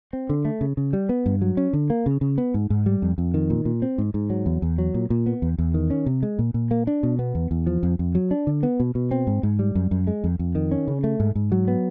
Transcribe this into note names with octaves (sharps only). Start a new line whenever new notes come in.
C4
D3
A3
C#3
C#3
G3
B3
G2
F#3
C#4
D3
A#3
C#3
C#3
B3
G#2
G#2
G3
F2
F2
D#3
A#2
A#2
C4
G#2
G#2
F#3
E2
E2
F#3
A#2
A#2
B3
E2
E2
D#3
C#4
C3
G#3
A#2
A#2
A#3
D4
B2
B3
E2
E2
F3
F2
F2
F#3
D4
D3
B3
B2
B2
C4
G#2
G#2
G3
F#2
F#2
G#3
F2
F2
D#3
C#4
C#3
A3
G#2
G#2
F#3
B3